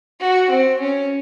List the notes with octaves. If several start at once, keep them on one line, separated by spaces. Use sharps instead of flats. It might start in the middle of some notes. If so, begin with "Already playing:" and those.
F#4
C4
C#4